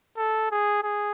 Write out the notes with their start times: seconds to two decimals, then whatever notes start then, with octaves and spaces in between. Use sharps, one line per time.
0.17 A4
0.51 G#4
0.83 G#4